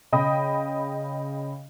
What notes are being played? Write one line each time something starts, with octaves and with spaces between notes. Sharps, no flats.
C#3 D#5 G5 B5 D#6